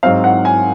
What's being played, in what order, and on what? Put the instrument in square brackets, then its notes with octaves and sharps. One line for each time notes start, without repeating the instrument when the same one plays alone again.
[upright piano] G#2 F#3 C4 F5
F#5
G#5